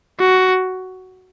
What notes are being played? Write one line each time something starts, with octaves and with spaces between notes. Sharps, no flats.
F#4